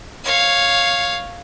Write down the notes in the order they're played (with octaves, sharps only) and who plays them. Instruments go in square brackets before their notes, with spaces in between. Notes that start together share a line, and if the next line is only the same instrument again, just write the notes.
[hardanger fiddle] C#5 F5